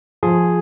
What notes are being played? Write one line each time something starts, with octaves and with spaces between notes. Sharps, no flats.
F3 G#4